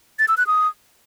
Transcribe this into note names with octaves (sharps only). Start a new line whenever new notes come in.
A6
E6
F#6
D#6